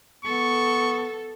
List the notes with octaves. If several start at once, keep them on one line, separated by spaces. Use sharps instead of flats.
B3 A4 C#6